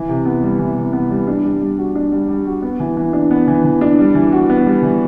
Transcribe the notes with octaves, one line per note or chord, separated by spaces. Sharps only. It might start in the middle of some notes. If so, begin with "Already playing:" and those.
Already playing: E3
C3
B3
G3
E3
C3
B3
G3
D4
G3
G3
F#4
D4
G3
G3
F#4
B3
E3
E3
D4
B3
E3
E3
D4
G3
E3
F#4
B3
G3
E3